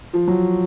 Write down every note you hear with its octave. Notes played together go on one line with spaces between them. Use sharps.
F3
F#3